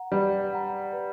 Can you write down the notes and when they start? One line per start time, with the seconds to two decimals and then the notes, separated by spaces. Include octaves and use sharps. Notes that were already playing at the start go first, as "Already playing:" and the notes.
Already playing: F#5 A#5
0.12 G3 B4
0.53 F#5 A#5
0.93 B4